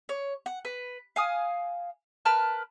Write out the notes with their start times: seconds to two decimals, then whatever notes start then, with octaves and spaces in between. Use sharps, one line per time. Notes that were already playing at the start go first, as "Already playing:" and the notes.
0.09 C#5
0.46 F#5
0.65 B4
1.16 F5 G#5 D#6
2.25 A#4 B4 A5 F6